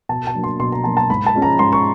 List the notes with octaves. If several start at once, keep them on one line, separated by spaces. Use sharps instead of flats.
B2 A5
A5
F#3 A#3 D4
C6
B2 C6
A#5
F#3 A#3 D4 A5
A5
G#2 B5
A5
F3 G#3 C#4
A#5
G#2 C6
C#6